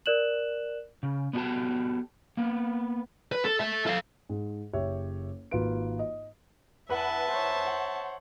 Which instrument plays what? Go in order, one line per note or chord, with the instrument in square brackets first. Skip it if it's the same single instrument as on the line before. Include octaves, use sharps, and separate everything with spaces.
[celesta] A#4 D5 F#6 E7 F#7
[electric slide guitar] C#3
B3 D4 F#4 G4 A4 A5
A#3 B3
[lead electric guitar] B4
A4
A4 E5
A4 F5
[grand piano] G#2
F#1 G4 C#5 E5
G#1 A#3 F4 F#4 B4 D7
D#5
[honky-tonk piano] E2 B4 F#5 [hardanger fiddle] E5 A5
[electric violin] C5 C#5
[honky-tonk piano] F#5